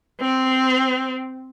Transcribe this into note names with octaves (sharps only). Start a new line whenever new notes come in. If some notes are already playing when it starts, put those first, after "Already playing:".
C4